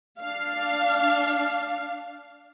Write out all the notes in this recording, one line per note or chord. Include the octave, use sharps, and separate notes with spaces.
D4 F5